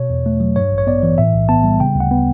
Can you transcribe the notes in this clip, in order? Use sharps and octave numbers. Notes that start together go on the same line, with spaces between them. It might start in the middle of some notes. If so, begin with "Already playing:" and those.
Already playing: B2 C#5
E2
A3
F#3
G2 C#5
A1
C#5
B3 D5
E3
A2 E5
B1
B3 A5
G3
C#3 G5
D2
F#5
B3